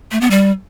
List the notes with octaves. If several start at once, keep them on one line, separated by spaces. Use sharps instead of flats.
A3
B3
G3